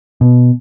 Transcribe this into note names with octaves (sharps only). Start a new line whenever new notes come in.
B2